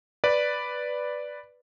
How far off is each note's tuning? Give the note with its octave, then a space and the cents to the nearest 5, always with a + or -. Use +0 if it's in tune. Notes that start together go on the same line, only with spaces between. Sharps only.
B4 +0 D5 +0